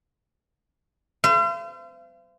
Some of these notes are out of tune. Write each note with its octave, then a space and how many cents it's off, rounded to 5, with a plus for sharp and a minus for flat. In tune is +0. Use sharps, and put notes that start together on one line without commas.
C5 -35 F5 -45